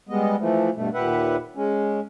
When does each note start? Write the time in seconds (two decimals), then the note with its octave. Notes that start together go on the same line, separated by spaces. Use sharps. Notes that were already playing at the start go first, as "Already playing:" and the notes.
0.09 G3 G#3 B3 D#5
0.39 E3 F3 A3
0.75 G2 B2 A3
0.94 D#2 A#2 G4 B4 E5 F#5
1.56 G#3 C#4